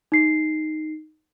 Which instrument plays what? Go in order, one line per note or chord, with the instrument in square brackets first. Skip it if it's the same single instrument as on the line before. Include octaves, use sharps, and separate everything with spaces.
[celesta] D#4 C7